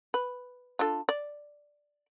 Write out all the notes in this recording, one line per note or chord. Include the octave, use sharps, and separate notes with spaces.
B4
D4 F4 A4
D5